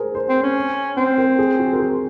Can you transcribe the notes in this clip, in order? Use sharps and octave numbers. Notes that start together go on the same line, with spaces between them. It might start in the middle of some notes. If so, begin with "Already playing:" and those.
Already playing: G#4 A#4 C5
C5
C4
C#4
C4 C5
A#4
G#4
F#4
A#4
G#4